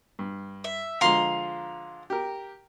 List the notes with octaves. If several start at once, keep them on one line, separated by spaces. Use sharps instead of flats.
G2
E5
D3 F3 G#3 F5 A#5 C6
G4 A#4